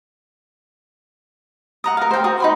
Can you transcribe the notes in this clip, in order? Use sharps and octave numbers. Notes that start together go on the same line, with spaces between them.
F#5 A#5 D#6
A#4 F5
C5 G5
F#4 D#6
D#4 B5 C6